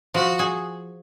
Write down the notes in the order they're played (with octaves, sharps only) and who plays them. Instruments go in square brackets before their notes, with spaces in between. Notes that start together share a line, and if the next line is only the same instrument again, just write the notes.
[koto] F3 [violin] F#4
[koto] G#4